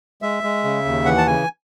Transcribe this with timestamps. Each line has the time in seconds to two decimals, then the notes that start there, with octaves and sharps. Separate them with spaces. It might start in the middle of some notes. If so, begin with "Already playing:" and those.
0.22 G#3 E5
0.43 G#3
0.64 C#3
0.85 D#2
1.05 E3 F#5
1.18 A5
1.26 C#3 G#5